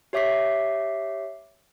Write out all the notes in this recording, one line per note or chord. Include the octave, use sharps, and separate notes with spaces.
G4 C#5 E5 D6 B6 C7